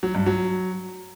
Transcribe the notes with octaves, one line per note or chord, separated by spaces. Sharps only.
F#3
G2
F#3